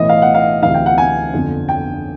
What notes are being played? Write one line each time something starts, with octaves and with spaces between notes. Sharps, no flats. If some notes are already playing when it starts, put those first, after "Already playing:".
Already playing: B1 A2 E3 D#5
F5
F#5
F5
D2 C3 E3 F5
G5
F#5
G#5
G1 F2 D3
G5